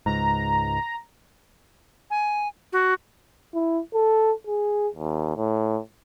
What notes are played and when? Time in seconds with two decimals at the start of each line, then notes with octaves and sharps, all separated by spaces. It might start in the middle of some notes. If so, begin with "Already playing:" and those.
0.06 C#2 G#2 A#5
2.11 G#5
2.73 F#4
3.54 E4
3.94 A4
4.47 G#4
4.95 D#2
5.36 A2